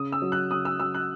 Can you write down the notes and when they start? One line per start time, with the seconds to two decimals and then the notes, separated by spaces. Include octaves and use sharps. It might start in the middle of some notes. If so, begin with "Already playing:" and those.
Already playing: C#3 D#6
0.12 E6
0.22 F#3
0.32 F#6
0.51 C#3 D#6
0.65 E6
0.80 F#3 E6
0.94 F#6